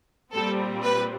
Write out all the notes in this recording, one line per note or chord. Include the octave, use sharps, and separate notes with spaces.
A#2 G3 C4 A4
B4